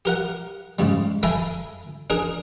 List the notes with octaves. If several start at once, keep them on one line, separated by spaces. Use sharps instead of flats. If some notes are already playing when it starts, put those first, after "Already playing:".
G4 A#4 F#5
G#2 C#3 G3
A4 E5 G5 G#5 A#5 B5
D4 G#4 A#4